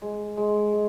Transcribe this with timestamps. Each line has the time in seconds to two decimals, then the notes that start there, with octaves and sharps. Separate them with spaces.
0.02 G#3
0.37 G#3
0.73 G#3